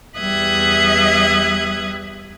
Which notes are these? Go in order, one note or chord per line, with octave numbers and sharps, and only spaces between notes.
E2 G3 E5 D#6 F#6 G#6